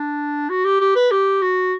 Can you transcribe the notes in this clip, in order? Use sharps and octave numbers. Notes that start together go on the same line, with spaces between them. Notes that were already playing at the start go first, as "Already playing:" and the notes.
Already playing: D4
F#4
G4
G4
B4
G4
F#4